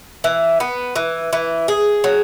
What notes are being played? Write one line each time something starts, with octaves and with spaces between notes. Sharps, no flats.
E3
B3
E3
E3
G#4
F#3